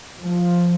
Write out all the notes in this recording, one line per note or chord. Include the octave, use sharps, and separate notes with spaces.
F3